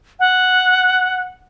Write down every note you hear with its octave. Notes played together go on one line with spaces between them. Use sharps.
F#5